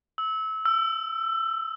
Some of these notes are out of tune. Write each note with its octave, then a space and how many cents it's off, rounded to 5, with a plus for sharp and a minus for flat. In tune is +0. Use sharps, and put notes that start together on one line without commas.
E6 -25
E6 +20